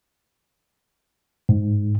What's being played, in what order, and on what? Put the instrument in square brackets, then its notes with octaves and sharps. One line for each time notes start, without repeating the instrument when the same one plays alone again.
[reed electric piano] G#2